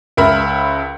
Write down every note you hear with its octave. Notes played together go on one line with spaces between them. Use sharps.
C#2 A#4 E5 B5